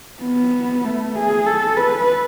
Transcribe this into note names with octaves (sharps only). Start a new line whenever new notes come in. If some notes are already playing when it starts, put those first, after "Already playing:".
B3
A3
G#4
A4
B4